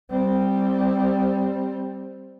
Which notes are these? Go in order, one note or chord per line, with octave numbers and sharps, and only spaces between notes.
G3 C4